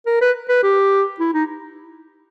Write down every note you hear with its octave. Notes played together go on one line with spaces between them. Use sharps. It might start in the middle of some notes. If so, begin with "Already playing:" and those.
A#4
B4
B4
G4
E4
D#4